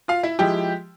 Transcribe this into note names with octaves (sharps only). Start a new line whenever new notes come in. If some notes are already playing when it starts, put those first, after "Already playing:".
F4 F5
E4 E5
F3 G#3 E4 G4 G5